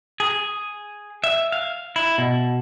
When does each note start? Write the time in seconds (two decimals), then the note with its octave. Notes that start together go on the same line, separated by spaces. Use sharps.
0.20 G#4
1.24 E5
1.52 F5
1.96 E4
2.18 B2